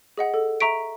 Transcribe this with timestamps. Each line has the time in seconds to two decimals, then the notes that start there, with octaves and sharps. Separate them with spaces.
0.17 G#4 D#5 F#5
0.34 A4
0.60 E5 A#5 C#6 B6 D7